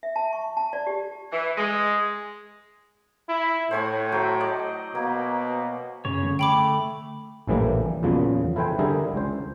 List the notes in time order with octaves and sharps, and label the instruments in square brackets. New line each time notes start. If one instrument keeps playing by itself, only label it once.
[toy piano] E5
A5
C#6
A5
D5
G4
[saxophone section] E3
G#3
[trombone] E4
[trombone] A2 [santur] C5 C#5 G#5
[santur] F#3 A4 G5
D5 D#5 A5
[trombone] B2 [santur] A#3
[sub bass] F#2 [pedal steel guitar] C#3 C#5
[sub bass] D3
[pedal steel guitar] A3 [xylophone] G5 B5 D6
[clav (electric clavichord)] A#1 A2 E3 G3 A#3
E2 A#2 C#3 F3 F#3
E4 A4 B4 C5 G5 G#5
D3 G3 E4 G#4 A#4
C#2 C5